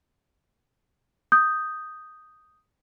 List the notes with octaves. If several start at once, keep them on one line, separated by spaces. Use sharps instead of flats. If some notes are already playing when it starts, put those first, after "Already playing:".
D#6 G6